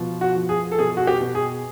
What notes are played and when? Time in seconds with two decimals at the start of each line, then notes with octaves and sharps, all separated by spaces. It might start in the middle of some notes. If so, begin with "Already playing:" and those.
Already playing: B2 F3
0.21 F#4
0.36 F3
0.49 G#4
0.72 A4
0.78 B2 G#4
0.97 F#4
1.07 G4
1.21 B2
1.35 G#4